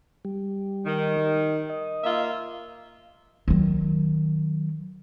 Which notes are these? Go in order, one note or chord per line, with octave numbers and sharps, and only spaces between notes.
G3
D#3
D#5
A#3 F4 E5
D#3 F#3